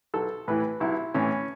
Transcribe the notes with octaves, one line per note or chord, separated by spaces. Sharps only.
B1 A4
A2 E3 B4
B1 E4
A2 E3 C#4